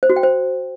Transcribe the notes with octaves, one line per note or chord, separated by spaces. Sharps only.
C5
F#4
G5
C5